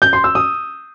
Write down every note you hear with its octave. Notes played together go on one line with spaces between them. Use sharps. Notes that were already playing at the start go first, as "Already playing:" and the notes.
G6
C6
E6
D#6